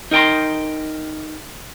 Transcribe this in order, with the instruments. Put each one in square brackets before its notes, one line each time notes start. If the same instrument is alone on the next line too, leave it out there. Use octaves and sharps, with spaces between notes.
[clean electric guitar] D#4 A#4 G5 A#5 C6